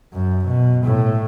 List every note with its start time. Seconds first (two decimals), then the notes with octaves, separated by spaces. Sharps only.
0.13 F#2
0.45 B2
0.85 A2